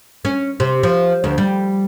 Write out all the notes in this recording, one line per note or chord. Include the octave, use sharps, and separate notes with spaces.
C#4
C3
F3
D2
G3